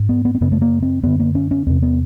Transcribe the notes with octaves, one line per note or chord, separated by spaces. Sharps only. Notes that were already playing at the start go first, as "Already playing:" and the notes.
Already playing: G#2
B3
B3
C4
F#2 C#3 B3
A3
A#3
C4
F#2 D3 B3
A#3
C#4
C#4
E2 C3 C4
B3